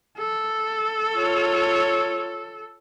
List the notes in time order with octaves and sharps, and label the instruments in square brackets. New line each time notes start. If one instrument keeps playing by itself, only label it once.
[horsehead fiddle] A4
[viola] F4 C#5